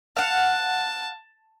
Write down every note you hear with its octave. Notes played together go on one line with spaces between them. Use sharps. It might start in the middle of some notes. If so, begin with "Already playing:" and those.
F5 F#5 A5